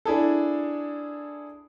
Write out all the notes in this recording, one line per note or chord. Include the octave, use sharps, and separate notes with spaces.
D4 E4 G#4 A4